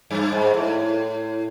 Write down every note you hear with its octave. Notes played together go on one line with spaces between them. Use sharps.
G2
G#2
A2